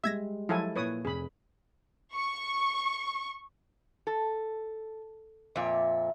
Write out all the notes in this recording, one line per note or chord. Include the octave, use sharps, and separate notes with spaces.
G3 G#3 G#4 E5 G#6 A#6
F3 F#3 E4 A4 G#5
A#2 E4 B4 C#5 D#6
F1 G#4 B5
C#6
A4
F2 A#2 E5